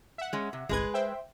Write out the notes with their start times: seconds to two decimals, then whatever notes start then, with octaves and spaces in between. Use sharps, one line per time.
0.18 E5 F#5
0.33 G#3 C#4
0.53 C3
0.69 G1 C2 G#3 G#4 B4 G#6
0.94 C5 E5 G5